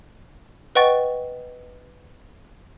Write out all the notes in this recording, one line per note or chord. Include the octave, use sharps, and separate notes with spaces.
B4 D#5 F#5 G5 C#6 A6